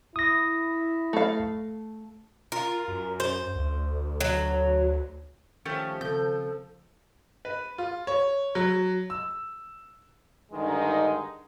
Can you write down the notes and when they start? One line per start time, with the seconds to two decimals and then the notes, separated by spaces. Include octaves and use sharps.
0.16 E4 D#6 A#6
1.13 A3 F5
2.52 F4 A#4
2.88 F#2
3.20 C5
3.55 D2
4.21 F#3
5.65 D#3 F3 A3 C#4 G4
6.01 C#3 C4 A4 G6
7.45 B4
7.78 F4
8.07 C#5
8.55 F#3
9.10 E6
10.52 G2 D3 D#3 G#3 D#4